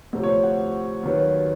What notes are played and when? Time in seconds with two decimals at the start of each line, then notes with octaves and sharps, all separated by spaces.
0.13 D2 C3 F3 C#5
0.23 C#5
0.28 C5
0.43 F#5
1.03 D#2 D#3 F#3 B3